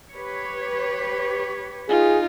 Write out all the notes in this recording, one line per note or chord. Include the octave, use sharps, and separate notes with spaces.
G4 B4 C#5
D#4 F4 G#4